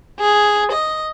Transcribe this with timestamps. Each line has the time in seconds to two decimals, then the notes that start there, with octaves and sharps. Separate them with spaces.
0.20 G#4
0.72 D#5